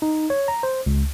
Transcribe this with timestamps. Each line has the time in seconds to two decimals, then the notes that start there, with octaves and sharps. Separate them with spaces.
0.02 D#4
0.30 C#5
0.48 A#5
0.63 C5
0.86 C#2